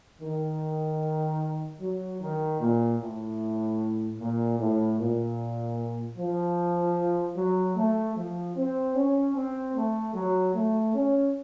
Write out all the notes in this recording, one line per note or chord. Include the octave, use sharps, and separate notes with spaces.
D#3
F#3
D#3
A#2
A2
A#2
A2
A#2
F3
F#3
A3
F3
C4
C#4
C4
A3
F#3
A3
C#4